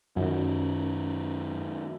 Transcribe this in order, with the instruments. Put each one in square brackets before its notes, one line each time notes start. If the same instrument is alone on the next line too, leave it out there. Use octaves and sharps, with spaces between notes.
[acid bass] F#2 [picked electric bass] D#3 F#3